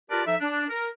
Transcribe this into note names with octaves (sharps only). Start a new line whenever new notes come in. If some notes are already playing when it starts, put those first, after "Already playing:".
F4 G4 A#4 B4 D5 A5
F3 D#4 A4 E5
D4
A#4